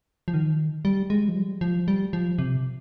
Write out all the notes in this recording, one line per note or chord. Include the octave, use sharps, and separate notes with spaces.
F3
D#3
G3
G#3
F3
G3
F3
G3
F3
C3